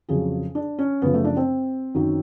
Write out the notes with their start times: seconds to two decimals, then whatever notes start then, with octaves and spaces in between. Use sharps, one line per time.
0.09 F2 C#3 F#3 G#4
0.55 D4
0.79 C#4
1.02 F#2 C#3 F3 B3
1.14 A3
1.24 D4
1.37 C4
1.94 F#2 D#3 F#3